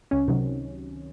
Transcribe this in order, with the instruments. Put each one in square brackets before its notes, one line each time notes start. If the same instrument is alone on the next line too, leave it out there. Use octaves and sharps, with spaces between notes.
[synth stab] C#2 C#4
C3 D#3 F#3